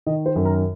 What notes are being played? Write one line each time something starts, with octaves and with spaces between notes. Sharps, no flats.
D#3 D#5
C5
F#2
A#4